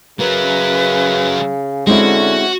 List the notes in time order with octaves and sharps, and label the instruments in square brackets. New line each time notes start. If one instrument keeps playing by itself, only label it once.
[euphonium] C#3 [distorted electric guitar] F#3 A#4 [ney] B4
[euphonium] D3 [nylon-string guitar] G#3 C4 E4 [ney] C#4 [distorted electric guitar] F#4